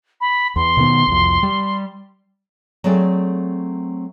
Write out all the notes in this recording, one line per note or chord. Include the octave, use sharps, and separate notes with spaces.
B5
E2 C6
B2 D#3 B3
C2 F2
G3
F#3 A3 C4 G#4 A4 D5